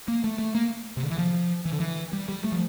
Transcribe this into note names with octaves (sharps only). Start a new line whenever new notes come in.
A#3
A3
A3
A#3
C3
D3
E3
F3
E3
D3
E3
G3
G3
A3
F3